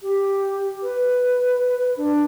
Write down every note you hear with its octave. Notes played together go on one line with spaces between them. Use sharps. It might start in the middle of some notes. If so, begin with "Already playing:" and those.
G4
B4
D4